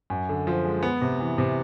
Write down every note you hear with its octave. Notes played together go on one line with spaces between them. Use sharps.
F#2
D3
F3
G#3
B3
C3
E3
C3